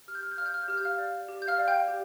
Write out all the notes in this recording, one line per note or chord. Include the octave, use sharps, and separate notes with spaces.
G4 F6
G6
F6
G6
D5 F5 F6
G6
F6
G6
G4 F6
G6
F5 F6
D5 F5
G4
G6
F5 F6
D5 F5
G5 G6
G4